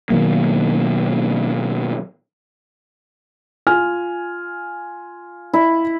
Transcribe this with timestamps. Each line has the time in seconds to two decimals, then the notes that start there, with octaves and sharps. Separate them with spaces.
0.10 B2 D#3 F#3 A#3
3.67 F4 G#5 F6
5.53 E4